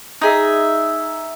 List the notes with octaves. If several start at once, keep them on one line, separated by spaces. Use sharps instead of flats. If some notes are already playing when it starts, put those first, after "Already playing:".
D#4 G#4 E5